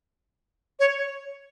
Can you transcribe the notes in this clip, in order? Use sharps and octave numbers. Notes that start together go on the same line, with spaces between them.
C#5